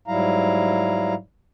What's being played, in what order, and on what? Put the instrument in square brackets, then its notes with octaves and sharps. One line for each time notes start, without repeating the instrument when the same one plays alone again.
[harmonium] G#2 F#3 G3 E4 F5 A#5